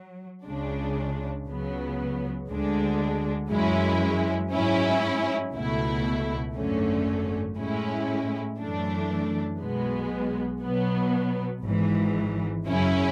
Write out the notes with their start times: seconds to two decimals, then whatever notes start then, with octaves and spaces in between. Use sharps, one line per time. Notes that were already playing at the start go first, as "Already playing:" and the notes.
Already playing: F#3
0.45 C#2 C#3 G#3 D4
1.47 C#2 C#3 F#3 B3
2.49 D2 D3 G#3 D4
3.50 F#2 E3 G#3 C#4 E4
4.52 G#2 F#3 C#4 E4
5.54 C#2 B2 A3 E4
6.55 G#1 F#2 D3 A3 C#4
7.57 A2 G#3 C#4 E4
8.59 F#2 E3 A3 D4
9.60 B1 B2 G#3 B3
10.62 B2 F#3 B3
11.64 G#1 G#2 E3
12.65 F#2 C#3 F#3 C#4 E4